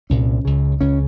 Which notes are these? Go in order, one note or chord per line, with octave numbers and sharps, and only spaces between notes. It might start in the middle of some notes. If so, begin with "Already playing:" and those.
C2 A#2 C#4
C#2 C#3
C#2 C#3 C#4